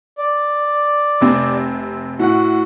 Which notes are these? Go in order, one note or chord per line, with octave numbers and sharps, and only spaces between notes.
D5
F1 C3 C4
A2 F#4 F#5